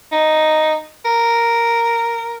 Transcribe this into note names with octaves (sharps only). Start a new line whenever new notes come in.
D#4
A#4